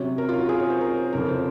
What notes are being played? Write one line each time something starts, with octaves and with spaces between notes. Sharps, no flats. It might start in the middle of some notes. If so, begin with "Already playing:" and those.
Already playing: C3 F#3 C#4
A#4
F4
F#4
G#4
C#5
C5
A#4
F2 C#3 F3 A#4
C5